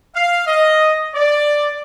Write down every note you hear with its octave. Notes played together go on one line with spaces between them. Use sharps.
F5
D#5
D5